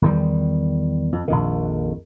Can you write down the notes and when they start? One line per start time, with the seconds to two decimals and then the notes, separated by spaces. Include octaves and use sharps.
0.02 E2 D#3 G3
1.13 F2
1.28 A#1 F2 D#3